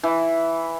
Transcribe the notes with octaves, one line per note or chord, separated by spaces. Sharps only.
E3